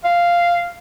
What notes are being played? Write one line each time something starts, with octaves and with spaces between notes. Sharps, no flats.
F5